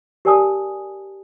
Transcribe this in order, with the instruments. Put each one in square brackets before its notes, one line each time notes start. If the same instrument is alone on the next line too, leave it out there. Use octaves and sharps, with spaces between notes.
[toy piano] G4 A#4 D5 G#5 A5 D#6